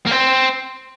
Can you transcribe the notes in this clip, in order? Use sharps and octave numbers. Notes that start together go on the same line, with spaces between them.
A#3
C4